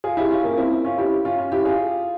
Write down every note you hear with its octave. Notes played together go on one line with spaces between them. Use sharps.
F4 G#4
E4 G4
C#4 F4
A#3 C#4
C4 E4
C#4 F4
E4 G4
C#4 F4
C#4 F4
E4 G4
F4 G#4